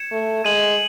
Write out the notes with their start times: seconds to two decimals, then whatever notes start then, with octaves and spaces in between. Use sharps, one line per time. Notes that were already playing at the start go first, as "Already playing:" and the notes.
Already playing: G#6 C#7 E7
0.12 A3
0.44 G#3 G#6 D#7 F#7